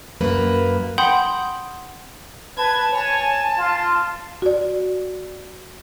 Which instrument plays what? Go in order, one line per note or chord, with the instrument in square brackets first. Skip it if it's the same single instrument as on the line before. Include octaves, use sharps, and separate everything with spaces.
[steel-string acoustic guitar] F#2 A#3 B4
[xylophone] F#5 G5 B5 C6 D#6 G6
[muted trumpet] B4 [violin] A5 G#6
[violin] C#5 A5 [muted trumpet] G#5
[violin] A5
[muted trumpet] F4
[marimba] F#4 D5